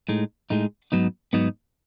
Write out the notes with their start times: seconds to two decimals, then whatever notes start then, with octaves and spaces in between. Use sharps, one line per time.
0.09 A2 G#3 D#4
0.50 A2 G#3 D#4
0.92 G#2 F#3 B3 D#4
1.33 G#2 F#3 B3 D#4